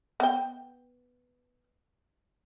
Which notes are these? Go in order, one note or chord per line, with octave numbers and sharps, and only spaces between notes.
B3 G5